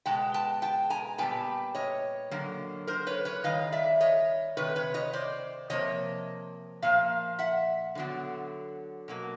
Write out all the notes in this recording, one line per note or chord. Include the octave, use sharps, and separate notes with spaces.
B2 G#3 B3 G5 A5
G5 A5
G5 A5
G#5 A#5
A#2 G3 B3 G5 A5
C#5 D#5
D3 F#3 A#3
A#4 C5
B4 C#5
B4 C#5
D#3 G3 D#5 F5
D5 E5
C#5 D#5
C3 D#3 B4 C#5
B4 C#5
C#5 D#5
C5 D5
C3 F3 A#3 C#5 D#5
A#2 F3 A#3 F5
E5 F#5
D3 F#3 B3
B2 F#3 A#3